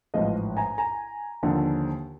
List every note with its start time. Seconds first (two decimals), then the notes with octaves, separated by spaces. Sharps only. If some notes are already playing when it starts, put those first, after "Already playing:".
0.14 A1 G#2 F3 D#5 F5
0.57 G#5 A#5
0.78 G#5 A#5
1.43 D#2 D3 F3